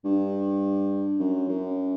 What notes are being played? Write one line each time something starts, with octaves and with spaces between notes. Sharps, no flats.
G2
F#2
F#2